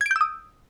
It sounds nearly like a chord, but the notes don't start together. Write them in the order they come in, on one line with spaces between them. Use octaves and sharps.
G#6 D7 G6 E6 D#6